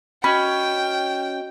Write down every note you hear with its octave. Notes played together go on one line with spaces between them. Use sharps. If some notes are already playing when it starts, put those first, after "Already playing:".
C#4 F#4 D#5 G5 B5